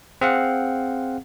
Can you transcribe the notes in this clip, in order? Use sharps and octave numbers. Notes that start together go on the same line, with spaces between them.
C4 G#4 F5 F#5